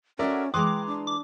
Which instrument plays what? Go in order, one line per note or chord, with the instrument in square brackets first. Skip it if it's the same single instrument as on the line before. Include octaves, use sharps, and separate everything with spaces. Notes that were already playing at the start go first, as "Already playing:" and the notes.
[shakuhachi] C#4 [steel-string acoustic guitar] F#4 A4 C#5 [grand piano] A#4 D5 E5
[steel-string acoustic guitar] E3 G#3 A#5 [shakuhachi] G5 [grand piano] C6 D#6 F#6 [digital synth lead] D6
[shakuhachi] D4
[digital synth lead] D6